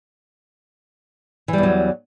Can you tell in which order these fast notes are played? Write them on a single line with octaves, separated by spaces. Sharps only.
E3 G3 E2 F#3